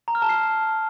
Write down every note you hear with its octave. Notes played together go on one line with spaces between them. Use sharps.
A#5
F6
A5
C7